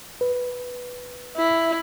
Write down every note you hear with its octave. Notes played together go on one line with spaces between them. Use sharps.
B4
E4